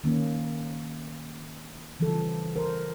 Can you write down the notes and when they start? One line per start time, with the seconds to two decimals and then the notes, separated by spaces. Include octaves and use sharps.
0.04 D#3 A#3 C#4
2.00 C#3 E3 F3 G3 A4
2.56 A#4 C5